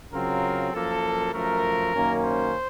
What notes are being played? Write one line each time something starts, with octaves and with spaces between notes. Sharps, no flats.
C#3 F#3 C4 F4 A#4
F#2 F3 A#3 A4
F#2 F3 A3 A#4
F#2 D#3 A#3 C#4
C5